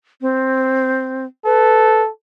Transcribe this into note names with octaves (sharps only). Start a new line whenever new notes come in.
C4
A4 B4